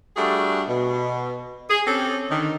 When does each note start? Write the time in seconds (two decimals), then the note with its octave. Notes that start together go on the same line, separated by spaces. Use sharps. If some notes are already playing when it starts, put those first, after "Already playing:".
0.16 G3 A3 D4 F#4 G#4
0.68 B2
1.69 G#4
1.87 C4 C#4 G4 A4
2.30 D3 D#3